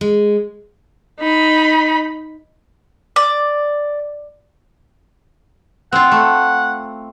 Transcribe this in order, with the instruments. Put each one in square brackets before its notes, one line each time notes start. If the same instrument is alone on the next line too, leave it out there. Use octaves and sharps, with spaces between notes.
[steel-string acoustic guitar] G#3
[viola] D#4 B5
[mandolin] D5
[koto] C4 F4 [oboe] F#5
[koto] A3